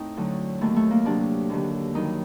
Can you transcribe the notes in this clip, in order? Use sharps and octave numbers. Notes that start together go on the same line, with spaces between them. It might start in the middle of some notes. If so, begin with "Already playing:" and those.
Already playing: A2 C4 D#4
D2 D3 F#3
D#2 D#3 F#3 A3
A3
A#3
D2 C3 F#3 D4
D#2 D3 F#3
G2 D#3 F#3 D#4